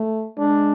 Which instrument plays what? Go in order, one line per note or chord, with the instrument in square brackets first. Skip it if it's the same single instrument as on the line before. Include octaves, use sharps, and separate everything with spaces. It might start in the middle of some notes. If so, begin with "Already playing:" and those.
Already playing: [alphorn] A3
[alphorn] G#3 [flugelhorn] D4